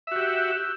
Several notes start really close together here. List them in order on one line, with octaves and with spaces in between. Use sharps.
E5 F#4 G4